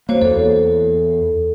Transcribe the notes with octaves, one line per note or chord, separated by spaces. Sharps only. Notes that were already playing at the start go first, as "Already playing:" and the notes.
A#3 F#4 C5 C#5
E2 A4